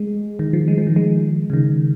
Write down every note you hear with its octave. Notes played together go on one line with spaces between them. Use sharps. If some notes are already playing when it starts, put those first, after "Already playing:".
Already playing: G#3
D#3
F3
G#3
F3
D#3
G#3
C#3
D#3